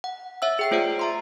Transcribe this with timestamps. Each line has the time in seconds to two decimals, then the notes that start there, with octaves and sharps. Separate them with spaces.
0.04 F#5
0.42 C#5 E5 F#5 E6
0.59 G#4 G5 C7
0.71 A3 F4 C5 D5 D7
0.99 E5 A#5 C6